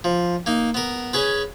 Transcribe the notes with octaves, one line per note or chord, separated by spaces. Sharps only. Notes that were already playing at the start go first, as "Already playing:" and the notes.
F3
A#3 D#4
B3 A#4
C#4 G#4 B4